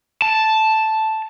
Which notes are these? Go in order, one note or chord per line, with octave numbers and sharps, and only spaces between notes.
A5